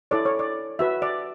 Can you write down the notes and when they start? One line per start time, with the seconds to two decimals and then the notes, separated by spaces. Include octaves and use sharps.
0.11 E4 A4 C#5 D5
0.25 C#5
0.39 D5
0.79 F#4 B4 E5
1.02 D5